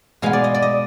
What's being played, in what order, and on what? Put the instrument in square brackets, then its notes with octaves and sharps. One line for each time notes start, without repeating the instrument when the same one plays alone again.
[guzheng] B2 G#3 B3 F5
D5
D#5
D5
D#5